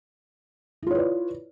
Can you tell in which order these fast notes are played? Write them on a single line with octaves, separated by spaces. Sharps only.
E4 F4 C#5 B4 D5